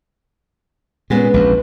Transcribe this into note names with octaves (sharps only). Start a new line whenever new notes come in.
A#2 G#3 B3 C#4
A#1 E2